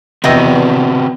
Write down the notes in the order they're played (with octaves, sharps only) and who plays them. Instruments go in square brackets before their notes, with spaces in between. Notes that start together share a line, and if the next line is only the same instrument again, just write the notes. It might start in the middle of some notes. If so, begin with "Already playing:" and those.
[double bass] E2 [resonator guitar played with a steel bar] C3 D#5 [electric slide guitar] C4 F#4 B4